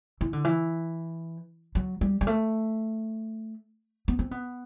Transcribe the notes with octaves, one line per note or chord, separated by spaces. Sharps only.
E3
D3
E3
F#3
G3
G3
A3
B3
C4
B3